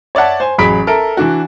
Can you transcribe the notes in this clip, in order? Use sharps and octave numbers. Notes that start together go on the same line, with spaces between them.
C#5 D5 E5 F#5 A5
C5 G#5
A1 F#3 G#4 B5 B6 D7
A4 A#4 E5 D7
E3 D4 F#4